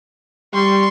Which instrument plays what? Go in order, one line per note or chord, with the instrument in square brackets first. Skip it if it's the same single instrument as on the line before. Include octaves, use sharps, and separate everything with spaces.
[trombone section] G3 [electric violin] C6 C#6